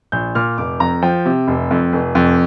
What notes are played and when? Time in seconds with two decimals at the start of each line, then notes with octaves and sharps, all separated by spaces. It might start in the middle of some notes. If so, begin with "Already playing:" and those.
0.12 A#1 G6
0.35 A#2 F6
0.58 F1 D6
0.80 F2 A#5
1.02 F3 G5
1.26 C3
1.48 F1
1.71 F2
1.93 F1
2.15 F2